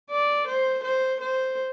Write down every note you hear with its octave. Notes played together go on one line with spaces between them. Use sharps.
D5
C5
C5
C5